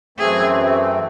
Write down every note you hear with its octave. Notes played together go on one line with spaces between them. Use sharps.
F#2 E3 A3 C4 G#4